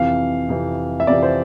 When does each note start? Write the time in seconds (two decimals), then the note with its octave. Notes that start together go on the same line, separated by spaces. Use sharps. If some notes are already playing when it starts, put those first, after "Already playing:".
Already playing: F2 C3 E3 F5
0.49 F2 C3 E3
1.00 E5
1.07 F2 C3 E3 D5
1.23 C5